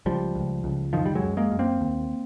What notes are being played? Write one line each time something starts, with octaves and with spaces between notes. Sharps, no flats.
C#2 F3 G3
C#2
C#2
F#2 D#3 F3
G3
F#3 G#3
F#2
G#3 A#3
F#2
A#3 C4
D#2